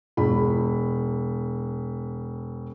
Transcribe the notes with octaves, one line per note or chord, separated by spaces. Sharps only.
E1 B5